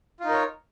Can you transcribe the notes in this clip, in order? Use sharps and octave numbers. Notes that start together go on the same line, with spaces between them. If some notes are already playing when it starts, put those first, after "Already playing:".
D#4 F4 A#4 C#5